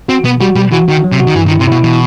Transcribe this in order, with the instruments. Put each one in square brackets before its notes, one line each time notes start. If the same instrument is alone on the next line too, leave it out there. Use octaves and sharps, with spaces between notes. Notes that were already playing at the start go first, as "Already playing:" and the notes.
[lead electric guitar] C4 [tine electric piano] F#4
[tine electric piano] B2 [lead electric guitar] B3
[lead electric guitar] G3 [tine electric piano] F#4
[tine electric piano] B2 [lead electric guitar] G3
[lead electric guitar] E3 [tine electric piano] F#4
[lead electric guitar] D#3 [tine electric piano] F#4
[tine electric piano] F#3
[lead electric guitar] C3
[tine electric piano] F#4
[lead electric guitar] D#3
[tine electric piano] G2 [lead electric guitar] E3
[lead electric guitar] D#3
[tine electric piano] E4
[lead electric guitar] C3
[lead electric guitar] B2 [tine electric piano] E4
[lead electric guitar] B2 [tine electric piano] E3